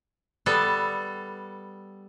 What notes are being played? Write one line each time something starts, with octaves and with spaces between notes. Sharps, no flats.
G3 B3 A4